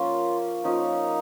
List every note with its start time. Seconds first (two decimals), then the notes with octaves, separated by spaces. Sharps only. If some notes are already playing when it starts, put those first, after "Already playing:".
Already playing: F3 A#3 C#4 F4
0.64 F3 A#3 C#4 D#4